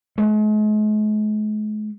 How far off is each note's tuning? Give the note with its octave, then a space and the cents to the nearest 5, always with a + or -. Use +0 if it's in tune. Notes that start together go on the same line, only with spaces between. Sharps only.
G#3 +45